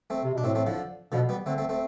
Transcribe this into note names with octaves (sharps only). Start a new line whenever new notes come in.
A3 C4
C3
B2 D4
A2 A3 C4
A3 C4
D3 F3
B2 D3 F3
G3 B3
D3 A3 C4
A3 C4
A3 C4